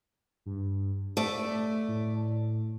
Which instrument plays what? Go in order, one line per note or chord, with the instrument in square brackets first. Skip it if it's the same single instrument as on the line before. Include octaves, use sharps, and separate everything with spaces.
[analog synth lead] G2
[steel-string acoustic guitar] A3 D5 [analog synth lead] E5
[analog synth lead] A2